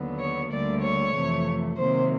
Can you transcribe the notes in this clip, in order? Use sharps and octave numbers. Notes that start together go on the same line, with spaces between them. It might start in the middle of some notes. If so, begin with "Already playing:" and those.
Already playing: D#2 D3 F#3 B3
C#5
D2 D3 G3 A#3 D5
C#5
F2 C3 E3 A3
C3 D#3 F#3 A#3 C5